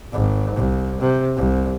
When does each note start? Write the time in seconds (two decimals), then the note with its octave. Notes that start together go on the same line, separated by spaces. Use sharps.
0.13 G#1
0.56 C2
1.00 C3
1.36 C2